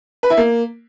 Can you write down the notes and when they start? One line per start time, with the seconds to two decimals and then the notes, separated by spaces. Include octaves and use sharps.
0.23 B4
0.30 E4
0.37 A#3